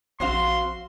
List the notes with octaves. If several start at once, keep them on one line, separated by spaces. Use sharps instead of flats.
A#1 C4 F#4 F5 C6